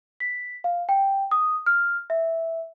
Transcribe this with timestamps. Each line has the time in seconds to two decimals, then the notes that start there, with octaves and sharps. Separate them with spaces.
0.20 B6
0.64 F5
0.89 G5
1.31 D#6
1.66 F6
2.10 E5